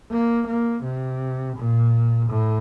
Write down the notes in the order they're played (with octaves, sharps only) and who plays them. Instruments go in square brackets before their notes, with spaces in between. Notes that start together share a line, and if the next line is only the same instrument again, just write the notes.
[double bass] A#3
A#3
C3
A#2
A2